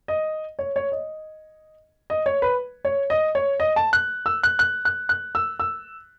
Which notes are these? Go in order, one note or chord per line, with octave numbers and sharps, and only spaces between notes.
D#5
C#5
C#5
D#5
D#5
C#5
B4
C#5
D#5
C#5
D#5
A5
F#6
E6
F#6
F#6
F#6
F#6
E6
E6